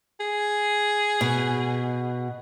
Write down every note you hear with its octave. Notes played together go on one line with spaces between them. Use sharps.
G#4
B2